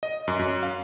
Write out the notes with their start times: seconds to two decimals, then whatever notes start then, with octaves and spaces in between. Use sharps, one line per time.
0.03 D#5
0.28 F#2
0.39 F#2
0.63 F5